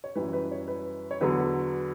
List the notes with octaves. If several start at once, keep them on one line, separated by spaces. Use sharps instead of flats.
C#5
F#2 E3 G3 B4
B4
C#5
B4
C#5
E2 D3 F#3 B4